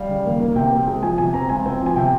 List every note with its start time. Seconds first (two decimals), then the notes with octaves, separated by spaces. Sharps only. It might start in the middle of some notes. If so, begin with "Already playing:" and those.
Already playing: G3 F5
0.09 C#3
0.25 D#2
0.40 A#3
0.56 C3 G5
0.72 C4
0.88 G#3
1.03 F3 G#5
1.18 C3 G#5
1.34 C4 A#5
1.49 C#2 G#5
1.66 C4
1.81 F3
1.86 G#5
1.96 C3 G5